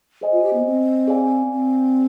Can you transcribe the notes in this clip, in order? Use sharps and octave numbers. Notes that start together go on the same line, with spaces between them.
G#4 C5 D#5 G#5
F4
G4
B3
C4
G#4 D5 F5 G#5
C4